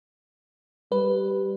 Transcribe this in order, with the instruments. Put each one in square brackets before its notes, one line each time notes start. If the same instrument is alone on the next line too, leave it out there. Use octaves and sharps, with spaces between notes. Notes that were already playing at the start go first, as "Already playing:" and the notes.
[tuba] G3 [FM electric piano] B4